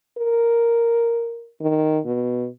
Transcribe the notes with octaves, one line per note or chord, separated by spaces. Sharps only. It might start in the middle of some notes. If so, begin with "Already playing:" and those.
A#4
D#3
B2